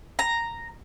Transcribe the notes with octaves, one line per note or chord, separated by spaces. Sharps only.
A#5